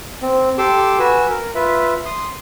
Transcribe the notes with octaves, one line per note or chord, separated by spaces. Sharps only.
C4
G4 A4 C6 D6 E6
F#4 B4 G#5 E6
A#4
F4 B4 E5
C6 D#6